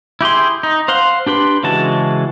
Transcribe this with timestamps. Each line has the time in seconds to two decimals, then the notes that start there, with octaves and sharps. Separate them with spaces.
0.21 E4 G4 G#4 C6
0.63 D#4
0.88 C5 F5 F#5 C6
1.27 D4 G4 B4 C6
1.63 C#3 E3 G#3 F#4 A5